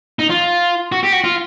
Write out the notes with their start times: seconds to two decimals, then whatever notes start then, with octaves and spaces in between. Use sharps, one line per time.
0.19 D#4
0.30 F4
0.92 F#4
1.03 G4
1.13 F#4
1.24 F4